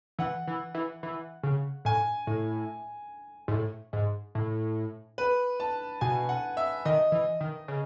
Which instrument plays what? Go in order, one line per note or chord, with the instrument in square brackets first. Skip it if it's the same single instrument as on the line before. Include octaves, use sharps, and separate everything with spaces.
[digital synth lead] E3 [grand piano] F#5
[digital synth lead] E3
E3
E3
C#3
[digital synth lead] A2 [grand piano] G#5
[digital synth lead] A2
G#2
A2
G#2
A2
[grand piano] B4
A5
[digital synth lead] B2 [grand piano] G#5
[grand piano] F#5
E5
[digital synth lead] D#3 [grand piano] D#5
[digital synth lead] E3
D#3
C#3